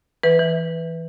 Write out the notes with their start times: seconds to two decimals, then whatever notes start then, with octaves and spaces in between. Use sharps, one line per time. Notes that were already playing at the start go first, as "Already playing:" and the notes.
0.23 E3 B4
0.39 E3